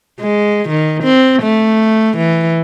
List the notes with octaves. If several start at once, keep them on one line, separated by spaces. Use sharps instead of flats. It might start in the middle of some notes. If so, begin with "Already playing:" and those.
G#3
D#3
C4
A3
E3